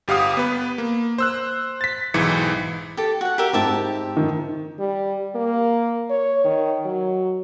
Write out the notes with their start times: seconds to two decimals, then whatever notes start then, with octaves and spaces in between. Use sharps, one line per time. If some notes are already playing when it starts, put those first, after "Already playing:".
0.08 G1 G4 F5 F#5 D#6
0.37 B3 B4
0.78 A#3
1.18 C5 E6 F#6
1.81 A6 B6
2.14 B1 G#2 E3 C#7
2.97 G4 A4
3.21 F#4 F#5
3.38 G4 A#4 E5
3.53 G#2 C4 G4 E5 A5
4.17 D#3
4.79 G3
5.35 A#3
6.10 C#5
6.45 D#3
6.85 F#3